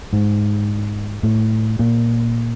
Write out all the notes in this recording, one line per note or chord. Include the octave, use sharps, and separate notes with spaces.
G#2
A2
A#2